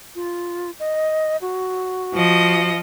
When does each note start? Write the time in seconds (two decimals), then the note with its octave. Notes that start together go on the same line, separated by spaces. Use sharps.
0.15 F4
0.80 D#5
1.41 F#4
2.14 F3 D#5